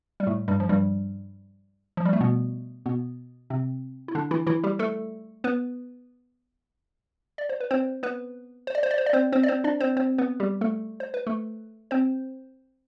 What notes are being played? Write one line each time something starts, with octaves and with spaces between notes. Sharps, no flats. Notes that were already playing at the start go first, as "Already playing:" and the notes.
G3
A2 A3
G2 G3
F3
G2 G3
F3
G3
A3
B2 B3
B2 B3
C3 C4
E4
D3 D4
E3 E4
E3 E4
G3 G4
A3 A4
B3 B4
D5
C5
B4
C4 C5
B3 B4
C5
D5
C5
D5
C5
D5
C4 C5
C4 C5
D5
C4 C5
D4 D5
C4 C5
C4 C5
B3 B4
G3 G4
A3 A4
C5
B4
A3 A4
C4 C5